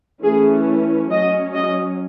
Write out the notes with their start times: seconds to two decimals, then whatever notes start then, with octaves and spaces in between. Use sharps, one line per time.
0.23 E3 A3 C#4 G#4
1.11 F#3 C#4 D#5
1.54 D#5